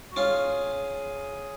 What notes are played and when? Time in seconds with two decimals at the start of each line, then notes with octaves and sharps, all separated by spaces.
0.12 F#4
0.16 C#4 F4 G#4